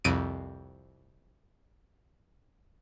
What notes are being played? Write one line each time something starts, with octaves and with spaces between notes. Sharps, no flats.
C2 F2 D7 D#7